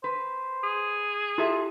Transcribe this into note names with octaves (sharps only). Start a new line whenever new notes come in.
B4 C5
G#4
E4 F4 G4 A4 E5